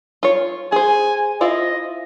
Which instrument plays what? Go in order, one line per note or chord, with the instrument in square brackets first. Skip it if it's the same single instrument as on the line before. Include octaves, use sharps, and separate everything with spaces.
[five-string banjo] F4 C#5
[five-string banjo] G#4 C5 [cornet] G#5
[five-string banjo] E4 F4 C5 [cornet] D#5